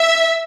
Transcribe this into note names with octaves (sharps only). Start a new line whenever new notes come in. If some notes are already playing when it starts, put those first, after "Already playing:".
Already playing: E5